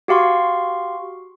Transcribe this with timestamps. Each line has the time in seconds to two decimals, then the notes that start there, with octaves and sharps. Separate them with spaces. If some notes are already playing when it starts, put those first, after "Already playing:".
0.08 F#4 G4 F5 C6 C#6